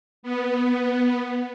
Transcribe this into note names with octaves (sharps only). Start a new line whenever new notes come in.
B3